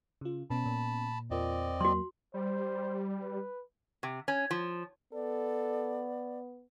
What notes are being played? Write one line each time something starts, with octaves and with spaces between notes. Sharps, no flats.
C#3 F4
B2 B3 C#4 A5 B5
A#2
E2 C4 F4 A#4 D5 D#5
F#3 A#3 F#4 C6
G3 C5
B4
C3
C#4
F3
B3 A4 D5